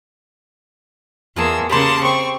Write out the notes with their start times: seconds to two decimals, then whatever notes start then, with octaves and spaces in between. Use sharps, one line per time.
1.36 E2 A#3 F4 G#4 A5 E6
1.69 C#3 A#3 G4 A5 B5 C6
2.02 C4 C#6